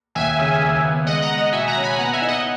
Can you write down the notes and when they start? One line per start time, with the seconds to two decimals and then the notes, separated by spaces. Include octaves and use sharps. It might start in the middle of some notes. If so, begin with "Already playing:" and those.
0.15 D#2 E5 G#5
0.39 C#3
0.62 D#2
0.85 B3
1.07 G#3 D#5 F#5
1.22 F#5 A#5
1.30 G#3
1.38 D#5 F#5
1.52 B2 E5 G#5
1.68 F#5 A#5
1.76 C#4
1.84 G#5 B5
1.98 B3 F#5 A#5
2.13 E5 G#5
2.22 D#4
2.28 D#5 F#5